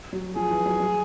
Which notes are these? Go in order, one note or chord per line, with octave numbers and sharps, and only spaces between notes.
F#3
F3 G#4
E3
F#3
F#3